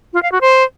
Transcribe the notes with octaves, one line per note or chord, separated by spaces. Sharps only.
F4
F5
F#4
C5